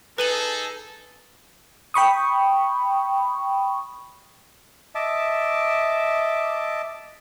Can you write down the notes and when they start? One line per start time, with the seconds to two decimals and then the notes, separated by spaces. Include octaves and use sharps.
0.18 D#4 G#4 A4 B4 D#7 F#7
1.94 G5 B5 C#6 D#6
4.95 D#5 E5 A5 D6